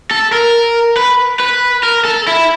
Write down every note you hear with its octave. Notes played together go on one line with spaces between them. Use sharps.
A4
A#4
B4
B4
A#4
A4
E4